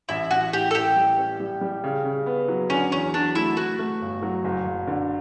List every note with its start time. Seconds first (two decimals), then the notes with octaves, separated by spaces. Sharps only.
0.09 A1 E4
0.31 A1 F#4
0.53 A2 G4
0.71 A4
0.74 A1 G4
0.96 G3
1.18 C#4
1.40 G3
1.61 G3
1.84 C#3
2.05 C#3
2.26 B3
2.48 F#3
2.70 D3 C#4
2.92 E2 C#4
3.14 F#3 D4
3.35 A3 E4
3.57 A3 F#4
3.79 A3
4.01 G1
4.22 F#3
4.44 F#1
4.66 F#1
4.88 D3